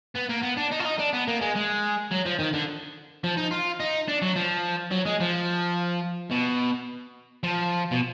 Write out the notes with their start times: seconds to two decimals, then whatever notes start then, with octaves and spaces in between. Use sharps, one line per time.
0.16 B3
0.30 A#3
0.43 B3
0.58 D4
0.72 D#4
0.80 F4
0.86 D#4
0.99 D4
1.13 B3
1.28 A#3
1.41 G#3
1.55 G#3
2.11 F#3
2.25 F3
2.39 D#3
2.54 D3
3.24 F3
3.37 D#4
3.51 F4
3.80 D#4
4.08 D4
4.22 F#3
4.36 F3
4.91 F#3
5.05 G#3
5.20 F3
6.31 B2
7.44 F3
7.92 B2